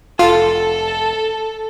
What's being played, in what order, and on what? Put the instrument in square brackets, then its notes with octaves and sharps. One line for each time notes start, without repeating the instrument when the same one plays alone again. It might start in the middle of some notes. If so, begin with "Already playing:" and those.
[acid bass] F1 [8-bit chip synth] F4 [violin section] A4